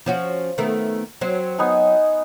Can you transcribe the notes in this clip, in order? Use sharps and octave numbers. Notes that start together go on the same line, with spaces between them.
F3 C#4 F#4
D#3 A3 B3
F#3 C4
B3 D#4 G#5